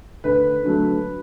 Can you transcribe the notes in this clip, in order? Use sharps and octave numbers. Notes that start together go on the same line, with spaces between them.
D2 B4
D3 F#3 A3